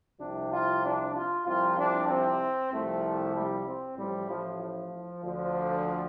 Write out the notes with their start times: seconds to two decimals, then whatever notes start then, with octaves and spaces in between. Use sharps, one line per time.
0.19 C2 C3 F3 D4
0.51 F4
0.83 D4
1.14 F4
1.46 C2 C3 F3 F4
1.77 D4
2.08 C4
2.71 C2 C3 F3 A3
3.34 G3
3.66 C4
3.97 A1 A2 F3 G3
4.28 F3
4.61 F3
5.23 D2 D3 F3